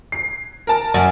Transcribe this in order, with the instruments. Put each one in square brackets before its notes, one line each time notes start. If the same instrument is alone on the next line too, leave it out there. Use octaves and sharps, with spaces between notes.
[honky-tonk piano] C7
A#4 A5
[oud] F#2